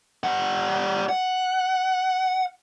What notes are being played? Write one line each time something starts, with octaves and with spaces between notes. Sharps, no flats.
G3 F#5
F#5